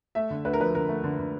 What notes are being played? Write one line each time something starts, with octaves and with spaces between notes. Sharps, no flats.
A3 E5
D3
D2 B4
A#4
F3 B4
D3 A#4
A3
D3
D3